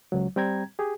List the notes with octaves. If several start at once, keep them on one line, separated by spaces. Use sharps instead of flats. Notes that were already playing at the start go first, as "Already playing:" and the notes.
C#2 F#3
G3 C4 G5 A#5 G#6
G4 G#4